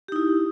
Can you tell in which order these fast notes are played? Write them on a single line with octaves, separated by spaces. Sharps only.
G4 D#4 E4